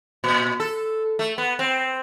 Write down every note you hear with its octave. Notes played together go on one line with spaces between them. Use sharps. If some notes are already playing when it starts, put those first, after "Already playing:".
A#2
A4
A3
B3
C4